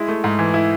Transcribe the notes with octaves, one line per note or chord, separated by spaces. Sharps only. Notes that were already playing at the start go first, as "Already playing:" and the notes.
Already playing: G#3 E4
A3
G#2
E3
E4